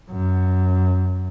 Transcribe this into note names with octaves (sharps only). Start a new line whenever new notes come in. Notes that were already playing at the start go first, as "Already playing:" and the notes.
F#2